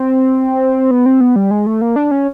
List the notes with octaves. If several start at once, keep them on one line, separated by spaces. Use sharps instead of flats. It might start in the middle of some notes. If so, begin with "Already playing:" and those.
Already playing: C4
B3
C4
B3
G3
G#3
A3
A#3
D4
C#4